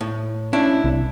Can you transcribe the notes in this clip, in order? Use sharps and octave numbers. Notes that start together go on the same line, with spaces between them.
A2
C#4 D4 E4
C2